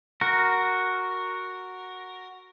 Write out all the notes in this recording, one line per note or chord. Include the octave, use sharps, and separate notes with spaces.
F#4 A#4